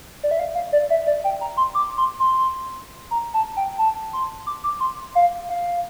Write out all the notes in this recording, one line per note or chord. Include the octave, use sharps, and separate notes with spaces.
D5
E5
F5
F5
D5
E5
D5
G5
A#5
C6
D6
C6
C6
A#5
A5
G5
A5
C6
D6
D6
C6
F5
F5